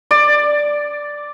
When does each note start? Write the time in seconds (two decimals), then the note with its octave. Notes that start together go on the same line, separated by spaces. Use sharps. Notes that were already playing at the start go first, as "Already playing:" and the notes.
0.11 D5